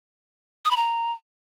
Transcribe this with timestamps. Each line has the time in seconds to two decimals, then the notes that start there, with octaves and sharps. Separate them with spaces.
0.65 D#6
0.71 B5
0.77 A#5